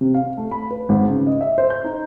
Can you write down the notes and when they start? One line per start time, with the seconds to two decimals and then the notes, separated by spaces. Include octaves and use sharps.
0.01 C3
0.14 F5
0.37 A3
0.51 B5
0.71 B4
0.89 G#1
1.10 C#3
1.27 D#5
1.41 E5
1.58 C5
1.70 G6
1.84 D#4